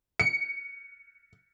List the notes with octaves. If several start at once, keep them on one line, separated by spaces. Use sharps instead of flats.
C#7